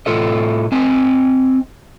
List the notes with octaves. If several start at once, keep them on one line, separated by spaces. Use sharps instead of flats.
A2 F4 A4 D#5
C4 D#5 G#5 A5